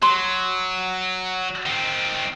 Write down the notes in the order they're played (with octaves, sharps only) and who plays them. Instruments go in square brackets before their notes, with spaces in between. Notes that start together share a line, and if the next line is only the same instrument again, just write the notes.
[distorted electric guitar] F#3 [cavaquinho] C6
[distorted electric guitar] D#3 C4